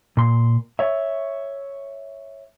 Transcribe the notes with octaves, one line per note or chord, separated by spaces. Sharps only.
A#2 C6
C#5 E5